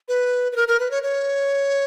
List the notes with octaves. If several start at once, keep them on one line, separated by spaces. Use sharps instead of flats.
B4
B4
A#4
A#4
B4
C#5
C#5